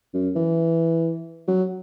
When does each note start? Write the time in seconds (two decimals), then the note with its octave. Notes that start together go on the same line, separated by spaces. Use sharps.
0.14 F#2
0.36 E3
1.48 F#3